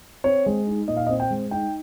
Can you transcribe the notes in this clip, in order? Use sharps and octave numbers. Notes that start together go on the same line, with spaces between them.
C4 C#5
G#3
D#4
A#2 D#5
F5
D#5
C4
G5
G#3
D#4 G5